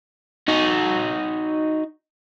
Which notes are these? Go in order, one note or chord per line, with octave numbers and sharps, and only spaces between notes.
D#4 F#4